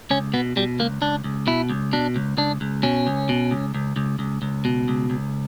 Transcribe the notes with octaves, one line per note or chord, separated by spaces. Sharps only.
C#2 C#4
B2 B3
B2 G3
C#2 A#3
C#2 D4
C#2
B2 E4
C#2
B2 D4
C#2
C#2 D4
C#2
B2 C#4
C#2
B2
C#2
C#2
C#2
C#2
C#2
B2
C#2
C#2